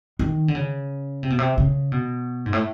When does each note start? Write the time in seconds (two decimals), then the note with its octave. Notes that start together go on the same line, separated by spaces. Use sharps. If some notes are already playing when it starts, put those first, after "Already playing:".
0.19 D#3
0.48 D3
0.55 C#3
1.23 C3
1.30 B2
1.39 C3
1.58 C#3
1.92 B2
2.46 G#2
2.53 A2